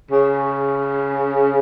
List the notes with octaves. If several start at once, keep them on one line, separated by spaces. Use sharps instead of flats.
C#3